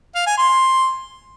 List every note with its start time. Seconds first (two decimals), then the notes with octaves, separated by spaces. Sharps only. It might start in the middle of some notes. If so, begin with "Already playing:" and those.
0.15 F5
0.26 G#5
0.38 C6